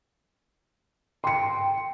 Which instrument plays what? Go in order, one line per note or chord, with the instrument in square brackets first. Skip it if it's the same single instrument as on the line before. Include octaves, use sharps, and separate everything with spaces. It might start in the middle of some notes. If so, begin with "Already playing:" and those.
[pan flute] G5 [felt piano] C6 C#7